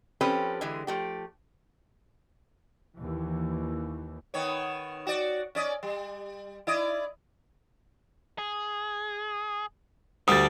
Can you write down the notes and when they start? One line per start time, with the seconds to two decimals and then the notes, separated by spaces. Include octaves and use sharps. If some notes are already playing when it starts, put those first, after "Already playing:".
0.21 F3 C4 C#4 G4 A4 B4
0.61 D3 E3 G#3
0.87 F3 A3 G4
2.95 D#2 E3
4.34 D#3 B3 C#5
5.07 F#4 D5
5.55 C#4 D5 D#5
5.83 G3
6.67 E4 D5 D#5
8.38 G#4
10.28 D2 G3 D4 D#6 A6